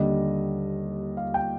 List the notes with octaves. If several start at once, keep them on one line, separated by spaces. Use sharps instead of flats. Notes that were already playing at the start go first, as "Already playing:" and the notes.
Already playing: D#2 D3 G3 D#5
F5
G5